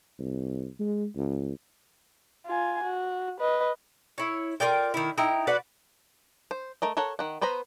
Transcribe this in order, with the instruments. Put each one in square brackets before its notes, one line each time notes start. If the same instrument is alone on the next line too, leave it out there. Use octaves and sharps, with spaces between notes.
[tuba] C2
G#3
C#2
[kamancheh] F4 G#5
F#4
B4 D#5
[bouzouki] E4 C#5
F4 A#4 D5 G5
D#3 E4
D#4 E4 G5 A#5
F#4 B4 D5 F#5
[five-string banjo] C5
A3 A#4 D#5
A4 A#4 C#5 F#5
D#3 F#5
B3 B4 C5 A#5 B5